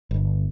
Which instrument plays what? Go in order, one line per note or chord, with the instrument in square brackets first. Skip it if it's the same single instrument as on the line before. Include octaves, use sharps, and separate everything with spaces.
[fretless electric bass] G1